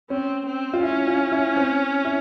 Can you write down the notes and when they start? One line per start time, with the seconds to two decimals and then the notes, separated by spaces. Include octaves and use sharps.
0.10 C4 C#4
0.46 C4
0.73 F4
0.83 C#4 E4
1.07 F4
1.32 E4
1.56 C4
2.05 E4